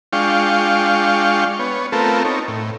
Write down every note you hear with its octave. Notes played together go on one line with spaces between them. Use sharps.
G#3 D4 F4 F5 G5 C#6
B3 C#5
A3 B3 C4 F4 A4 A#4
C4 D#4 C#5
A2